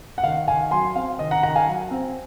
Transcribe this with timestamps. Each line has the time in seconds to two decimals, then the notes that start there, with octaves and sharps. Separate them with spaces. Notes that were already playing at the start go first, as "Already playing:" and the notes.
0.18 F#5
0.23 D#3 F5
0.48 D#3 F5 G#5
0.71 F#3 G#5 C6
0.96 C4 F5
1.19 D#3 D#5
1.31 F#5 A#5
1.43 D#3 F#5 A#5
1.56 F5 G#5
1.68 F#3
1.91 C4